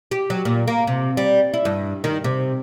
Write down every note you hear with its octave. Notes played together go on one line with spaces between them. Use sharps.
G4
F#3
A#2
A#3
C3
G3
E4
G2
D#3
C3